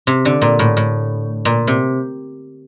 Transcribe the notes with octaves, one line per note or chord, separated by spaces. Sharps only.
C3
D3
A#2
A2
A2
A#2
C3